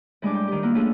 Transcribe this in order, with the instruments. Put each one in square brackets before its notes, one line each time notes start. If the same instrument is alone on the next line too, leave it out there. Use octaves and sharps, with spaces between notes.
[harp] A2 G3 G#3 D4 G#5 D6
G5
D#3 G4
A#3 B3 E4 F4
A3 C#4 D4 F4 G#4 A4